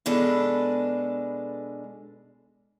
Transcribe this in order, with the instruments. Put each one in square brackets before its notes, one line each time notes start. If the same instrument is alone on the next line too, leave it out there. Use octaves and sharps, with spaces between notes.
[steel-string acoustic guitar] B2 G#3 D4 A4 B4